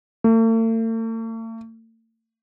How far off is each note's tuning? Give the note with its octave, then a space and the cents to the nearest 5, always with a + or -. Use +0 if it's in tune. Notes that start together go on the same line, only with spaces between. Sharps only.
A3 +45